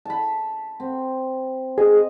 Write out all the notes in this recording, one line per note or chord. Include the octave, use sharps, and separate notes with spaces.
A5 B5
C4
G#4 D#5